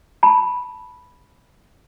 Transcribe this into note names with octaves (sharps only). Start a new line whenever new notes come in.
A5 B5